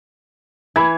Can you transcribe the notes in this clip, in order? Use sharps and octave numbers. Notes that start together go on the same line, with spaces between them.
E3 B5 G#6